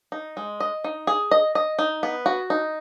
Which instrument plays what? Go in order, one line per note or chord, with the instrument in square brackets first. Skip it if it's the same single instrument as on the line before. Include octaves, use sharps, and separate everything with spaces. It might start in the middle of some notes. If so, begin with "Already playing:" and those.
[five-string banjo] D#4
G#3
D#5
D#4
G#4
D#5
D#5
D#4
B3
F#4
D#4